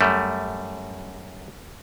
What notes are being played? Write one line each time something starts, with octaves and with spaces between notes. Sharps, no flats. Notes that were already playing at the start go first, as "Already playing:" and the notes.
F#2 G3 A3